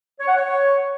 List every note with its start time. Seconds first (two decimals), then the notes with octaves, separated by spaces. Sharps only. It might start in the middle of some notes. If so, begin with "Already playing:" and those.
0.20 C#5
0.28 F#5
0.36 C#5